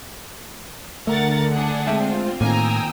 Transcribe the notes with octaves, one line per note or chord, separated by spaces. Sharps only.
D2 D3 A3 A#4 F#5 A6
D4 G#4 F#5
G#3 C4 F4 E5 G5
A2 D#3 A#3 G5 G#5 A#5 D#6 E6